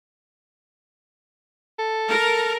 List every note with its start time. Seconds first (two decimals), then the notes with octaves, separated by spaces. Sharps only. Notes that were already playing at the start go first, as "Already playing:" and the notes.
1.79 A4
2.08 A#4